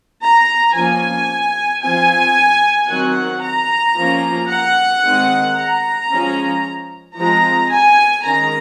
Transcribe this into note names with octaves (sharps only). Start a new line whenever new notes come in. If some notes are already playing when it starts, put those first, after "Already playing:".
A#5
F3 A#3 C#4 G#5
F3 C4 G#5
D#3 F#3 C4 F#5
A#5
F3 A#3 C#4
F#5
D#3 G#3 C4
A#5
F3 G#3 C#4
F3 G#3 C4 A#5
G#5
D#3 G#3 C#4 A#5